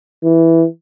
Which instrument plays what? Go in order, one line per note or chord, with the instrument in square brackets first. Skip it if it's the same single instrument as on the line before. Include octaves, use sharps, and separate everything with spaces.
[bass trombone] E3